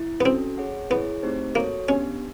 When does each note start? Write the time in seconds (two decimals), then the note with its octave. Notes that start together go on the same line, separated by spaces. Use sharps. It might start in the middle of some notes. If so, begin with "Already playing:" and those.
Already playing: E4
0.21 B3
0.25 C4 C#4 F#4 A4
0.58 G#4 C#5 F#5
0.90 B3 E4 G#4 C#5
1.23 A3 C4 D#4 G4 C5
1.55 A#3 F#4 A4 C#5
1.88 B3 C#4 D4 G4